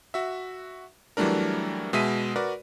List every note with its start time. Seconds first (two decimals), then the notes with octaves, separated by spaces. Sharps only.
0.14 F#4 E5
1.17 E3 F#3 G3 A3 D4 A#4
1.93 B2 G#3 E5 B6 D#7
2.36 F#4 A#4 B4 D5